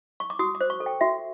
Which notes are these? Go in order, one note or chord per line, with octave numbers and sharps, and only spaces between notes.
C#6
D6
F#4 D#6
D6
C5
C#6
A4
G5
F#4 E5